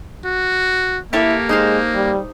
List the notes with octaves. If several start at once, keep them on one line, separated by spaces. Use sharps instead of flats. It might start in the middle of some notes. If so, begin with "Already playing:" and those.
F#4
A#3 E4 G4 A4 C#5
G#3 D#4 C5 F5
G3